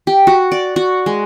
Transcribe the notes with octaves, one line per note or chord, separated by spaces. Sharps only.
G4
F#4
D5
F#4
G#3